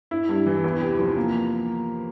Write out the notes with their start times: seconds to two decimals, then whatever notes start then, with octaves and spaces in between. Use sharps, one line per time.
0.11 E4
0.29 G2
0.46 E3
0.64 E2
0.81 C3
0.99 F3
1.17 A#3